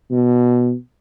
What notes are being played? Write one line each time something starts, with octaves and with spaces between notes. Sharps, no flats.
B2